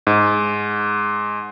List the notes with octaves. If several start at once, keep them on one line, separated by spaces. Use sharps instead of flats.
G#2